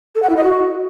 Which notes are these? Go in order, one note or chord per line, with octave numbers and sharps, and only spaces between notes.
A4
F#5
E4
D#5
F#4